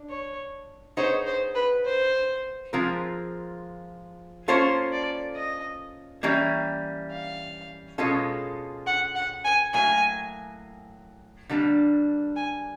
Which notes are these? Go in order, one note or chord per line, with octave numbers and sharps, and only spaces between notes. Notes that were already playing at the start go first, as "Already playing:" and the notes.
Already playing: D4
C#5
B3 D#4 G#4 C5 C#5
C5
B4
C5
F3 G#3 C4 F4 A#4
A#3 C#4 F4 A4 C5 C#5
D5
D#5
E3 G3 A#3 C#4
F5
B2 G#3 C#4 F4 A4
F#5
F#5
G#5
A2 F#3 A#3 G#5
D3 G3 A#3 D4
G#5